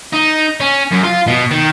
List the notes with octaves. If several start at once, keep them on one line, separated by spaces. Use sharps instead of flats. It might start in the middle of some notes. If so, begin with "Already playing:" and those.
D#4
C#4
F#2
F4
B2
D#3